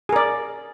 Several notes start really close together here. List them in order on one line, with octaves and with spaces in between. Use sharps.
G#4 A#4 D5